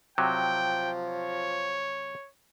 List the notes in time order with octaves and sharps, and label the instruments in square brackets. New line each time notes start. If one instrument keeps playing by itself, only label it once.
[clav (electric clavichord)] C3 F#3 [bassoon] F3 [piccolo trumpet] G5
[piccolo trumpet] C#5